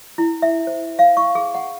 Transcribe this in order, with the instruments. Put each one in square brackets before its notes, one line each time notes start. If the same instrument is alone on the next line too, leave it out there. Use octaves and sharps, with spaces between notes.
[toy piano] E4
E5
C5
F5
C#6
G#4
F#5